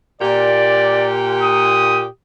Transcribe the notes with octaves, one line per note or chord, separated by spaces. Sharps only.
A#2 G4 D5
D#6